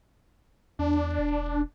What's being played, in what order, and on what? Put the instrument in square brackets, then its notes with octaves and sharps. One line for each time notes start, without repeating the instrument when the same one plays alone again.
[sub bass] E2 [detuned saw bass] D4
[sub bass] E1